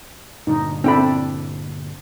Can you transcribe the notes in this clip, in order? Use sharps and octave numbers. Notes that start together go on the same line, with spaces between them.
G2 A#2 D3 D#4
C4 D4 E4 A4 G5 B5